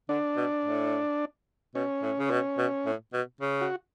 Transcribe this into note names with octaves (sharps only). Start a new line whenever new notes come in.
D3 D4
B2
A2
B2 C#4
A2
C#3
B2
B2
A2
B2
C#3
F#4